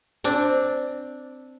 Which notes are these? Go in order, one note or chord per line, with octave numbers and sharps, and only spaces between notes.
C4 D4